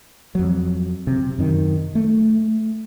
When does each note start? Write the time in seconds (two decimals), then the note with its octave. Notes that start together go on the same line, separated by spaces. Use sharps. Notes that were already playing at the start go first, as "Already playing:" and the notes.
0.35 F2 F#3
1.07 C3
1.39 F#2 D#3
1.95 A3